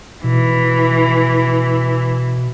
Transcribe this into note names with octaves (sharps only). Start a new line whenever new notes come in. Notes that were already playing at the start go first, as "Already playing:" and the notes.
B2 E3